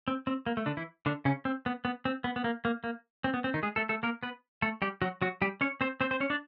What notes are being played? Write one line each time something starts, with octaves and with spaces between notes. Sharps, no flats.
C4
C4
A#3
A3
D3 D4
E3 E4
D3 D4
C#3 C#4
C4
B3
B3
C4
B3
B3
A#3
A#3
A#3
C4
B3
C4
D#3 D#4
G#3 G#4
A3 A4
A3 A4
A#3 A#4
B3 B4
A3 A4
G3 G4
F#3 F#4
F#3 F#4
G3 G4
C#4 C#5
C4 C5
C4 C5
C4 C5
C#4 C#5
D4 D5